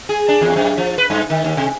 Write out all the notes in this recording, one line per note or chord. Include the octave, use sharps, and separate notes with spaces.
G#4
D4
E2
F#2
F3
B4
G2
D#3
D#2
C3